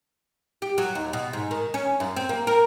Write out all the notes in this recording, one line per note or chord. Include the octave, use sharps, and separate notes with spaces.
G4
F#3
D#2
B2
G#2
D#3
C#4
F#2
C4
A#3
A#4